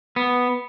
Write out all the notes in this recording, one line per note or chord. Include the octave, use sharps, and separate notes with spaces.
B3